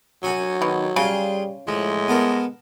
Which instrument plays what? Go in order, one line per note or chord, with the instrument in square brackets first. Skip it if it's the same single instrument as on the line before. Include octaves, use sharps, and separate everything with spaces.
[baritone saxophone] F#3 [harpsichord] F#4 G#5 C#6
[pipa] B2 [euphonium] D#3
[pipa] C#3 [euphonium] G3 [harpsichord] F4 G#4 G5
[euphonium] A2 [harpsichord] F3 [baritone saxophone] G#3
[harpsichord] B3 A4 A#4